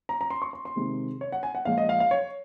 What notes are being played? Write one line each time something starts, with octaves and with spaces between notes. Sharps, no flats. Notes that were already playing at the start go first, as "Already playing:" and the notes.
A#5
A#5
C6
C#6
C6
C6
C3 D#3 G#3
C#5
F#5
G#5
F#5
A#2 F3 G#3 F5
D#5
F5
F5
C#5